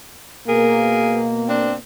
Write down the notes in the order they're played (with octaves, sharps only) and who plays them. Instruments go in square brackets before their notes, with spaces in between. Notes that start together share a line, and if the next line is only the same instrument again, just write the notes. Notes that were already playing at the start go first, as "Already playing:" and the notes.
[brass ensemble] B2 A#3 [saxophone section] B3 G#4 A#4
[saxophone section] C4 D4 C5